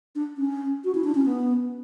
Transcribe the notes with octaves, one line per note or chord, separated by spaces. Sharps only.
D4
C#4
F#4
E4
D4
C#4
B3